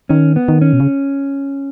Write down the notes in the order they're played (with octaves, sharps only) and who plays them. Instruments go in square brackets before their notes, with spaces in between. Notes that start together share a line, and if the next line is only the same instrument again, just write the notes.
[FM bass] D#3 [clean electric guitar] C#4
[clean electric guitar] B3
[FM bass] D#3
[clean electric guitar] C#4
[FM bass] B2
C#3